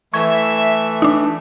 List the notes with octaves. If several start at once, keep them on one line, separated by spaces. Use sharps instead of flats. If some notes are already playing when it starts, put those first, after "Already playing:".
E3 A3 E5 C#6 G#6
D4 D#4